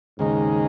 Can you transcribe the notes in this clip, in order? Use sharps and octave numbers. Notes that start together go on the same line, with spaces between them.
D#2 G#2 C#3 G#3 D#4